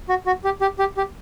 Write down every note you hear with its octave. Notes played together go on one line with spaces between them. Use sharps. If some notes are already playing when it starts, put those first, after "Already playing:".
F#4
F#4
G4
G4
G4
G4